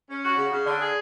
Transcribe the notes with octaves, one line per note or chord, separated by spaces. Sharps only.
C#4
F#4
C#3
C#3
D3
G#4